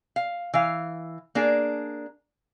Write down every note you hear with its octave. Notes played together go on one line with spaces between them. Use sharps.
F5
E3 F5
A#3 D4 G#4